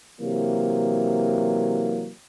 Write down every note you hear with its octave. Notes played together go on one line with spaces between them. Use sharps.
C3 E3 F#3 A#3